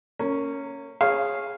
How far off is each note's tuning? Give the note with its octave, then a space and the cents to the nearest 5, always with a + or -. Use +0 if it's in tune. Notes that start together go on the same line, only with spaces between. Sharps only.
A#3 -20 C#4 +0
G#4 +0 C#5 -20 F5 -5